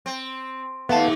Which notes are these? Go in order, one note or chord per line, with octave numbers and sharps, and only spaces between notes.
C4
D#2 A3 B3 F5 A5